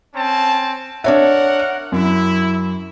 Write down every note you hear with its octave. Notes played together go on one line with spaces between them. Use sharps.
C4 C#4 A5
D4 A#4 C#5 E5 F#5
F#2 E4